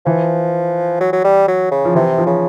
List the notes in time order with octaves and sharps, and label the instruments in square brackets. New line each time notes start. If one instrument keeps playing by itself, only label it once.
[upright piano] E3 [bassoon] F3
[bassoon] F#3
F#3
G3
F#3
C#3
[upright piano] F3
[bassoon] C3 [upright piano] E3
[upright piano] F3
[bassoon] C#3